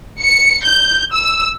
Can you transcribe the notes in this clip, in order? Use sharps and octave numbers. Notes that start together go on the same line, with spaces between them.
C#7
G6
E6